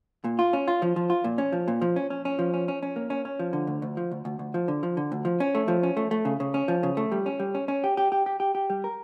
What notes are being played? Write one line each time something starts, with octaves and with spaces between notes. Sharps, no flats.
A#2
F4
C#4
F4
F3
F3
F4
A#2
C#4
F3
A#2
F3
C#4
C#4
C#4
F3
C#4
C#4
C#4
A#3
C#4
C#4
F3
D3
D2
D2
F3
D2
D2
D2
F3
D3
F3
D3
D2
F3
C#4
A3
F3
C#4
A3
A3
C#3
C#3
C#4
F3
C#3
A3
G3
C#4
G3
C#4
C#4
G4
G4
G4
G4
G4
G4
G3
A#4